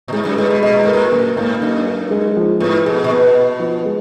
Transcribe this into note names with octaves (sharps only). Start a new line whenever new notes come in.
A#2
G#2 G#3
F#2
G#2 G#3
B2
B2 D#5
A#2
G#2 A#4
A#2
F#2 A#3
G#2 A#3
F#2 D#4
A#4
G#3
F3
G#2 B3
B2 G#4
A#2
B2 B3
B3
F3
G#3